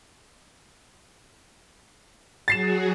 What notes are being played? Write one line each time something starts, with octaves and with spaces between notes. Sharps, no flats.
F#3 F#4 G#4 A6 C7 E7